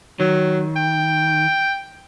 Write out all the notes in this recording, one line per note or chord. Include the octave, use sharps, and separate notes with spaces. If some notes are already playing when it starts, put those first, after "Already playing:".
D#3 F#3
G5